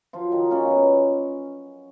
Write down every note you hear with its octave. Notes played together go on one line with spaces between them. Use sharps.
F3 F#3 F4
D#3 D#4
A#2 C#3 C#4
A#3
B3